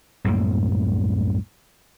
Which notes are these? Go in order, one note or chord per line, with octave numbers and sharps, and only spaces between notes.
C2 F#2 A2 A#3